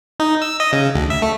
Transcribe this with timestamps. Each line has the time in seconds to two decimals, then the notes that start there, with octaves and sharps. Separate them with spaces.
0.20 D#4
0.42 E6
0.60 D#5
0.72 C#3
0.95 D2
1.10 E5
1.22 A3